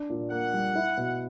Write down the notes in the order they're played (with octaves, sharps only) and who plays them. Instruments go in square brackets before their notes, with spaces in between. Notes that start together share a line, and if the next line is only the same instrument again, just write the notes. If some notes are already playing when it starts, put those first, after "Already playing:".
Already playing: [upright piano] D4
A#2
[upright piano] A#3 [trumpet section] F#5
[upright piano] G3
E4
B2